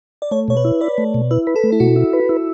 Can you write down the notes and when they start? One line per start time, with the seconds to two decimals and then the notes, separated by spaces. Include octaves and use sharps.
0.22 D5
0.31 A3 C#5
0.48 B2 C#5
0.57 B4
0.65 E4
0.81 B4 D5
0.98 A3
1.14 B2
1.31 E4 B4
1.47 B4
1.56 A4
1.63 A3
1.72 E4
1.80 B2 F#4
1.96 E4
2.13 B4
2.29 E4